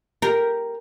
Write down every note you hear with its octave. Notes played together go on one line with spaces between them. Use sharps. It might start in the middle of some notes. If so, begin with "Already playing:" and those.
G4 A#4